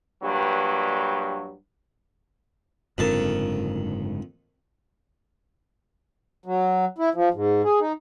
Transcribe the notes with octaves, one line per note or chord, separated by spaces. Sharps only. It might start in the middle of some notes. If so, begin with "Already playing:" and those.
G2 A#2 F#3 G4 B4
F#1 F2 G#2 D3 D#3 A5
F#3
E4
F3
G#2
G#4
D#4